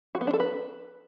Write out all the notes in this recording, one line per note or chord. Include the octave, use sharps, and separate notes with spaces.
F#4
B3
D4
A4
B4